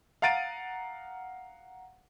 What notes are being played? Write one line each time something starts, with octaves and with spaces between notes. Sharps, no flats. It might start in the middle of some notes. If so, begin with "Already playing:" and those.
F5 F#5 A#5 A6 D7 D#7